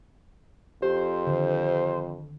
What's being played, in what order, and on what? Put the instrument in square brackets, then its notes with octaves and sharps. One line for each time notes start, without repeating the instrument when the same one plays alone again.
[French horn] F2 [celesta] G4 [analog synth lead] C5
[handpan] D3 D#3